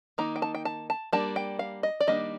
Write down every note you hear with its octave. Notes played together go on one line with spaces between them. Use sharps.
D#3 A#3 D#4 A#5
G5
A5
G5
A5
A5
G3 A#3 D4 A5
G5
F5
D#5
D5
D#3 G3 A#3 D4 D#5